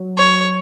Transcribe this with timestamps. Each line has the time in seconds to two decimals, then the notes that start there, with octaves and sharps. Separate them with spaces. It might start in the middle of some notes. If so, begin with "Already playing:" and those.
Already playing: F#3
0.17 C#5